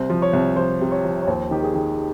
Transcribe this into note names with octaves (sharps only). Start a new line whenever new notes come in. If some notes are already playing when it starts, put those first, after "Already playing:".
Already playing: C2 C5
F3
C#5
C2
F3 C5
C3
C#5
F3
C#5
D#2 C5
D#3 G4
G#4
D#3